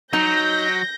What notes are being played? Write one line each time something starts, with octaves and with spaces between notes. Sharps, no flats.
F#3 D#4 G6 A#6